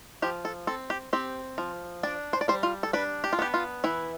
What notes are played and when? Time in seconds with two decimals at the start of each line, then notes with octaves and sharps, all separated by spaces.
0.22 F3 G4
0.45 A4
0.67 C4 A4
0.90 G4
1.13 C4 G4
1.58 F3
2.03 D4 D5
2.33 C5
2.41 D5
2.48 G3 C5
2.63 F4
2.83 A4
2.93 D4 B4
3.24 G4
3.33 F4
3.39 B3 G4
3.54 F4
3.84 E3 E4